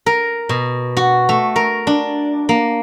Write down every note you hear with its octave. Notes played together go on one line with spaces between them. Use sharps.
A#4
B2
F#4
A3
A#4
D4
A#3